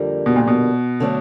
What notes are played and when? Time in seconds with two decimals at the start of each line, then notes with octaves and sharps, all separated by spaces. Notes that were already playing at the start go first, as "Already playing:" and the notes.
Already playing: F2 D3 G3 A#3
0.26 B2
0.36 A#2
0.48 B2
1.00 D3 F#3 A3 D4